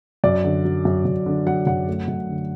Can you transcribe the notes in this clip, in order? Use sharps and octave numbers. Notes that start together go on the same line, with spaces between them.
F#2 D5
D3
F#3
F#2
F#2
D3
F#3 F#5
F#2 F#5
A3
F#2
D3